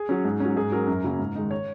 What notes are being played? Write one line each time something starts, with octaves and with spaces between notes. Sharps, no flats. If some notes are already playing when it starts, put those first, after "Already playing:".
Already playing: G#4
F#3 C#4
G#2
C#4
F#3
G#2 G#4
F#3 C#4 A#4
F#2
C#3 F#3 A#3 C#4
G#2
D#3 G#3 D#4
C#5